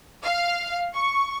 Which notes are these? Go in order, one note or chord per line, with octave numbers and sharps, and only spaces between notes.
F5
C#6